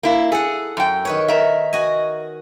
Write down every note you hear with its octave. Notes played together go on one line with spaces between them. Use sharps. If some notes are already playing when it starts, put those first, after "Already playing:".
A#3 E4
G#4 A4 F#5
F#2 G5
D#3 B4 C#5
A#4 E5
F#4 D#5 G#5